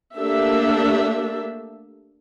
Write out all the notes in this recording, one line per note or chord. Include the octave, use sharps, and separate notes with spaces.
A3 A#3 D4 G4 E5